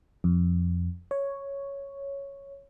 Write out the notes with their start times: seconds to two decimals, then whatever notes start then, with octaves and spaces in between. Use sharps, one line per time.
0.24 F2
1.11 C#5